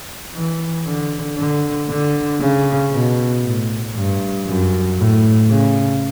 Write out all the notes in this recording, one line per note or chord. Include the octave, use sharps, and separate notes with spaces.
E3
D3
D3
D3
C#3
B2
A2
G2
F#2
A2
C#3